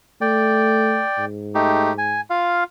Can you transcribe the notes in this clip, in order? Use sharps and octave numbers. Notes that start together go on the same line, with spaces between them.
A3 D5 G5
G#2
A3 D#4 G4
G#5
F4 F5